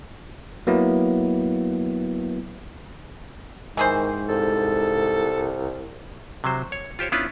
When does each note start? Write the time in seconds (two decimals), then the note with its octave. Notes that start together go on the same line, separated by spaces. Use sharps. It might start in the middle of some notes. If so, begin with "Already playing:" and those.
0.67 F#3 A#3 B3 E4
3.77 G#2 D#3 E3 G#4 C5
4.29 C2 A4
6.44 C3 F#3 C5
6.72 C#5
6.99 F4 G4 C5 C#5
7.12 B3 C#4 D4 E4 F4 B4